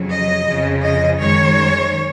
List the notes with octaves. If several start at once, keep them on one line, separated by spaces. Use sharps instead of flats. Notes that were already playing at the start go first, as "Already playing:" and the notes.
Already playing: F2 C#3 F#3
D#5
F2 C#3 F3
D#5
F#2 D#3 G#3 C#5